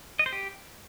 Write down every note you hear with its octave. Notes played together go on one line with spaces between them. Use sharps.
D#5
C5
G4